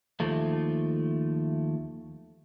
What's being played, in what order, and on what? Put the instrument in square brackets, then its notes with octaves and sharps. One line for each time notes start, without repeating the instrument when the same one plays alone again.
[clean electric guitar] D#2 F3 A3